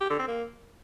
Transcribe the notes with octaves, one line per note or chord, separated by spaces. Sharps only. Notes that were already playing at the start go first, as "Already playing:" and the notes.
G4
D3
C4
A#3